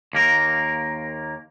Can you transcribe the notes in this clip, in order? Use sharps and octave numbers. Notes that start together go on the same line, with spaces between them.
D#2 A#3 A#4